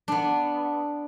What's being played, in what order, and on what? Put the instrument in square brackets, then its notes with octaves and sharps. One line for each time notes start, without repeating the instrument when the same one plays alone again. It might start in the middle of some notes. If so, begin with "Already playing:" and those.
[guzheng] B3 D4